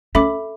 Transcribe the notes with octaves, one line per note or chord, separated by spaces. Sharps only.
C#4 A4 E5 B5 D6